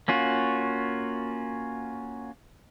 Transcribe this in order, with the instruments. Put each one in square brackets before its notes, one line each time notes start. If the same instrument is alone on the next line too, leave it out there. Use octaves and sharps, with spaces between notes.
[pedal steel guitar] A#3 C#4 F4 F#4